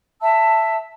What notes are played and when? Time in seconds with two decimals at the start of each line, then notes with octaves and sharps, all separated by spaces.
0.21 E5 A5 E6